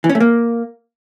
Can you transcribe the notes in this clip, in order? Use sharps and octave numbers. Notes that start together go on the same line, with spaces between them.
E3
C#4
A3
A#3